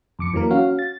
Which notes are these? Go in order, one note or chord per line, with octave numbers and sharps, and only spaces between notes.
F2 D6 C#7
E3 F#3 A#3 A#4
C#4 F#4 F5
A6